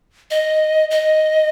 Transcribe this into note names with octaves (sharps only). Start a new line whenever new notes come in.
D#5
D#5